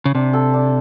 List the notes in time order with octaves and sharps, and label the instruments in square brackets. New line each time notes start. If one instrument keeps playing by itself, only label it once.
[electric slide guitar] C#3
[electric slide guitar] C3 [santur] D4
[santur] A4
D4